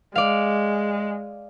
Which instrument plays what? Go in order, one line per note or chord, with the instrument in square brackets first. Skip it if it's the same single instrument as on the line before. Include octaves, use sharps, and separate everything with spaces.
[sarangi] G#3 [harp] D5 F5